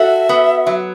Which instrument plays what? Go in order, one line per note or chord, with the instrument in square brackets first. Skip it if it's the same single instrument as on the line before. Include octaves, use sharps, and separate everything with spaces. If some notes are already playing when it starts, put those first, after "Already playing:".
Already playing: [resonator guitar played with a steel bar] F#4 A4 [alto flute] E5
[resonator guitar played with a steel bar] B3
F#3